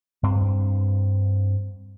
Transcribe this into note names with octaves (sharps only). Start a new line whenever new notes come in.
G2 C4